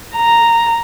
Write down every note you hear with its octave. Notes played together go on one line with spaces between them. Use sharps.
A#5